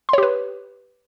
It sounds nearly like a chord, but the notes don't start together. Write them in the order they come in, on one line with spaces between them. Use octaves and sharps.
C6 C#5 G4 B4